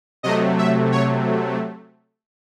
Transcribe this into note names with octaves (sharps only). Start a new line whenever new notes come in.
C3 F#3 A3 D#5
E5
C#5